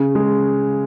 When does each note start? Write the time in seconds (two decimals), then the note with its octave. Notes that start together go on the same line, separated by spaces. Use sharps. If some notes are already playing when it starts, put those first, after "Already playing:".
Already playing: C#3
0.15 G#3